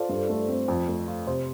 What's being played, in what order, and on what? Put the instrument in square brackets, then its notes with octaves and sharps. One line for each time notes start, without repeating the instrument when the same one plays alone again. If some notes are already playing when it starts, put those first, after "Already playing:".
Already playing: [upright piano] F4 [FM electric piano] A4 C5 D5
[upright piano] G2
A3
C4
F2
A3
F4
[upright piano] C3 [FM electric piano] C5